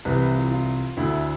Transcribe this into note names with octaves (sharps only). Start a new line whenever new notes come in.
C2 C3 E3 B4
F4
F4
D2 D3 E4